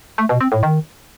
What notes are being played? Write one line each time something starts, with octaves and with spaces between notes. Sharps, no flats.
A3
B2
C4
A2
D#3